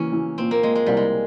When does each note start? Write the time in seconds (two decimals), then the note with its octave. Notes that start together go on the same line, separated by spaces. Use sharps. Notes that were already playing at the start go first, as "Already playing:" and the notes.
Already playing: E3 A#3 C#4
0.13 E3
0.38 A#2 C4
0.51 A#3
0.63 A#2 G#3
0.75 G#3
0.86 C2 G3
0.97 G#3